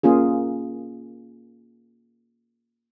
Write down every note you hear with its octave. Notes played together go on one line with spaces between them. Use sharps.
A#3 C#4 F4 G#4